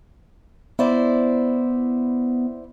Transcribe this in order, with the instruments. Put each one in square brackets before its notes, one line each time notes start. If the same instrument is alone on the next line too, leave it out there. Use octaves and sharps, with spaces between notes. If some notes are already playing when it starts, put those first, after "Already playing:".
[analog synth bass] B3 [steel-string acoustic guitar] E4 C5 D5